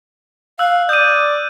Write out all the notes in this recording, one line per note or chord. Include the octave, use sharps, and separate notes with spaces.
F5 E6 F#6
D5 D#6 G6 D#7